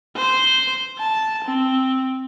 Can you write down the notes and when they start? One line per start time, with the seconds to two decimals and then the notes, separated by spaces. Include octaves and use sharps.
0.16 C5
0.99 A5
1.44 C4